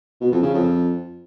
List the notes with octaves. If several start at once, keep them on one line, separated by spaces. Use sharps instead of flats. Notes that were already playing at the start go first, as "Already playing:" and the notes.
B2
F2
C#3
F2